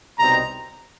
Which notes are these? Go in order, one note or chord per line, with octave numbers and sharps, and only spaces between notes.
C2 B2 G3 C4 D#4 A#5